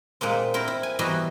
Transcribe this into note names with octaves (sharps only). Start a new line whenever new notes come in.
A#2 G#3 A#3 C4
C4 E4 A#4
E4
G#5
B2 E3 G3 F#4 D#5 A#5